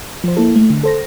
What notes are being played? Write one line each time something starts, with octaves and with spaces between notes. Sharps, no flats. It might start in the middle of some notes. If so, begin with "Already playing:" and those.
F3 C5
A#3 E4 A4
A3
D3
A4 C5 A#6